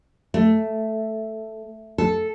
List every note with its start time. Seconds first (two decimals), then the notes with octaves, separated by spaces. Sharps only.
0.34 A3
1.98 A4